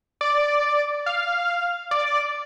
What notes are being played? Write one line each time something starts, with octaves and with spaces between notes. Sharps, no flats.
D5
F5
D5